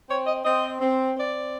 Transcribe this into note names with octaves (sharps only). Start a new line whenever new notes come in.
C4 C#5
D#5
C4 D#5
C4
C4 D5